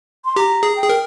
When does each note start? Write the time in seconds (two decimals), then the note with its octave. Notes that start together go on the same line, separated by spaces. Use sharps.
0.25 C6
0.36 G4 A#5
0.63 G#4
0.76 G5
0.82 G#4
0.89 A#4